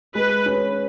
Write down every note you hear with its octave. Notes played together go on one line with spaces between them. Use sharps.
G#3 B4
C#4